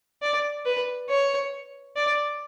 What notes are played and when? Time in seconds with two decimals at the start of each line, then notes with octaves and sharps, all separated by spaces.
0.22 D5
0.65 B4
1.09 C#5
1.96 D5